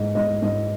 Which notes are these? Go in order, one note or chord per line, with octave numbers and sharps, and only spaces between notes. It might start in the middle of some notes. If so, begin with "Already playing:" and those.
Already playing: G#2 G#3 D#5
G#2 D#5
G#2 D#5